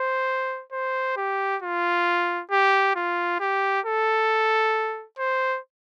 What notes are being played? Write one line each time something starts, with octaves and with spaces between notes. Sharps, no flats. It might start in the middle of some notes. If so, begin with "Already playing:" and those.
Already playing: C5
C5
G4
F4
G4
F4
G4
A4
C5